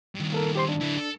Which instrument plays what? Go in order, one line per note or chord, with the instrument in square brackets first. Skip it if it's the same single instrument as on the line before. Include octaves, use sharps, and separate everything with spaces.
[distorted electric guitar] G2 D#3
[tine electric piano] A#3 A4 A#4
G4 C5 C6
D4
[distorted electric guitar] D3 E4
A4